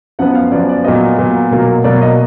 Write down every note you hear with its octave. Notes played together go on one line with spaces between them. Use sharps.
F#2 F3 B3 F#5
F5
F#2 F3 B3 D5
D5
A#2 F#3 B3 D#5
A#2 F#3 B3
B2 F#3 A#3
B2 F#3 A#3 D5
D#5